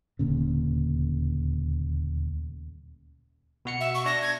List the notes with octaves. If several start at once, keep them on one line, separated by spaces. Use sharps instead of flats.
D#1 D2 A#2 C#3
B2 F#4 C#7
E5
C#6
D4 A#6
G#6